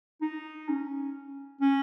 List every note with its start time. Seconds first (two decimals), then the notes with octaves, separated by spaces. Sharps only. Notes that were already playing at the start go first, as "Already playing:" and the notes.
0.22 D#4
0.69 C#4
1.61 C#4